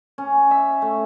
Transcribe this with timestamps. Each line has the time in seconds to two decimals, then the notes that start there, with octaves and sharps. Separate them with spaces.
0.18 C#4
0.51 E5
0.82 A3